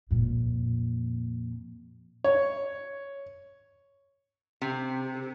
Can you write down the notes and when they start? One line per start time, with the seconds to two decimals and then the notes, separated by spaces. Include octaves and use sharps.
0.11 F2 A#2
2.24 C#5
4.62 C3